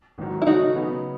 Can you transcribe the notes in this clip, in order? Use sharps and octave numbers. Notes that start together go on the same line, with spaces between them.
A1 G#2 D#3 F#3
E4
C#3 F#3 A3 C#4 D#4 F#4
C#3 F#3 B3 D#4 F#4